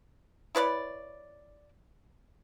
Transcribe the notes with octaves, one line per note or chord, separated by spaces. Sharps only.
E4 B4 C#5 D5